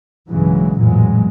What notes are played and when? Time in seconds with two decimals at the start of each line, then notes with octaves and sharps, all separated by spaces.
0.29 B1 G2 C#3 E3 F#3 G#3
0.78 A1 F2 A#2 E3 F#3 G#3